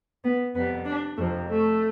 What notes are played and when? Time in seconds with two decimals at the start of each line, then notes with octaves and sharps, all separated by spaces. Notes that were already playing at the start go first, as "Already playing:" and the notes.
0.24 B3
0.55 F2 C3 G3 B3
0.85 D4
1.17 F2 C3 F3 A3
1.48 A3